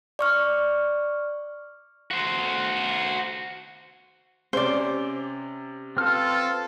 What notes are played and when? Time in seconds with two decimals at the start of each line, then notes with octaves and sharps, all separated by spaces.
0.19 D5 C#6 F6
2.11 F#4 C5
4.53 C3 C#4 C5 D5
5.97 C4 F4 A4 B4 F6